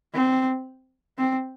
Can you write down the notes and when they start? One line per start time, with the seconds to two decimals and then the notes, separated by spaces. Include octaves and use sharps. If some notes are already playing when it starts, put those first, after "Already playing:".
0.14 C4
1.18 C4